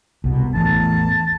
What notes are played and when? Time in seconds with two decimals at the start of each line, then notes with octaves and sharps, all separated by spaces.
0.24 C2 B2
0.55 A1 E2 A5